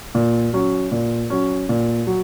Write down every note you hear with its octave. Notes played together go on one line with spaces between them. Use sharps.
A#2
F#3 C#4
A#2
F#3 C#4
A#2
F#3